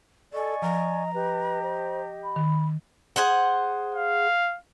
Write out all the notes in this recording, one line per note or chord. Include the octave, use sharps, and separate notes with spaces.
A4 D5 D#5 G#5 C#6
F3 A#5
G4 B4 D#5
C5
B5
D#3
G#4 C5 F#5
F5